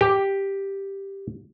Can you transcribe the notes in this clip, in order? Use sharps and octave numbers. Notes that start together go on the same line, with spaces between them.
G4